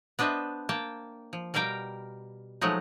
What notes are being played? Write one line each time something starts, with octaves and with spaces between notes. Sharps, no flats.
B3 D4 B4 C5 D#5 E5
A#3 G5 A5
F3
B2 G3 A#4 F5 G5 A#5
F3 F#3 G#3 A3 D#4